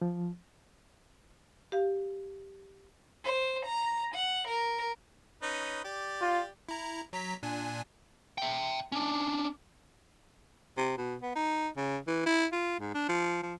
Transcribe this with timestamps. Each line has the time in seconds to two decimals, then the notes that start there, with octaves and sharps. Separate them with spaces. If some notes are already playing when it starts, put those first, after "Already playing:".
0.01 F3
1.72 G4 F5
3.24 C5
3.65 A#5
4.15 F#5
4.49 A#4
5.42 C#4 D#4 B4
5.84 G4 D5
6.21 F4
6.69 E4 A#5
7.13 F#3 A#5 B6
7.43 A#2 D4 G#5
8.38 E5 G5
8.92 C#4 D4
10.77 C3
10.97 B2
11.22 B3
11.35 D#4
11.76 C#3
12.07 E3
12.26 E4
12.52 F4
12.80 G#2
12.94 D4
13.09 F3
13.43 F3